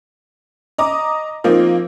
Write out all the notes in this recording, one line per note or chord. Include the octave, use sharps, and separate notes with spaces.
D#5 A#5 D6 D#6
F3 A#3 C4 D#4